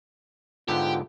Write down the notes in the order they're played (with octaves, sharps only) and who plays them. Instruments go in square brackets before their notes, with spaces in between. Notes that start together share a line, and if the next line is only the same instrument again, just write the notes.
[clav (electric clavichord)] G#2 D3 B3 [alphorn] F4 [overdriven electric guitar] G4